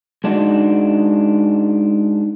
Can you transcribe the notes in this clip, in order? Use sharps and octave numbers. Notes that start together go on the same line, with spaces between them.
G#3 D4 D#4 F#4